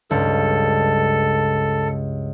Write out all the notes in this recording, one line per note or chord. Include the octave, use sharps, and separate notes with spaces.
C#2 G2 A4